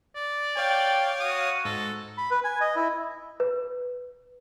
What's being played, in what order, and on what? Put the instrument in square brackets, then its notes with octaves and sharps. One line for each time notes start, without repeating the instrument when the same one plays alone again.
[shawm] D5
[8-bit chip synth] C#5 F5 [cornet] G5
[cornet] F#4 [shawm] D#6
[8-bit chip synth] G#2 [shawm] A4
[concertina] B5
B4
G#5
D#5
E4
[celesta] B4